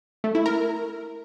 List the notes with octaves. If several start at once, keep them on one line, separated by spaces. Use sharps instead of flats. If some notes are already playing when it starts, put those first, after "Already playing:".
A3
E4
A#4